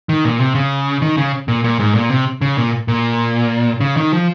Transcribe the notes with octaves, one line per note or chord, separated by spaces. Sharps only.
D#3
A#2
C3
C#3
D#3
C#3
A#2
A#2
G#2
A#2
C3
C#3
A#2
A#2
C#3
D#3
F3